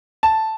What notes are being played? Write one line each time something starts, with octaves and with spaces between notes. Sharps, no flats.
A5